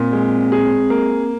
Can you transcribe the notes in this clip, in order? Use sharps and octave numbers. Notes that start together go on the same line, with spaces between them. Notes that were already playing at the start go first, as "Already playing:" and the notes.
Already playing: A#2 C4
G#3
G#4
A#3